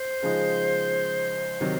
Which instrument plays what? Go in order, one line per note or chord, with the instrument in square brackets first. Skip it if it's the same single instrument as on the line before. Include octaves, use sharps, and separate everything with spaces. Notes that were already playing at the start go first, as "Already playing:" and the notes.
Already playing: [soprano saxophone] C5
[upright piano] C#3 F3 G#3 D#4
C3 D#3 F#3